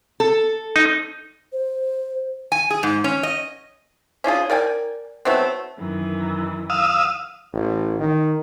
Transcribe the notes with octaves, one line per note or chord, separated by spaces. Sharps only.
A4
D#4
C5
G#5
G#4
G#2
C#4
D#5
C#4 D4 F4 G#4
A#4 D5 G5 G#5
F#3 A3 B3 C4
F#2 D#3 E3
F5 D#6 E6
A1
D#3